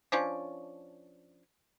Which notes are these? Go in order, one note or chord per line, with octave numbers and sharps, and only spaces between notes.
F3 C#4 D4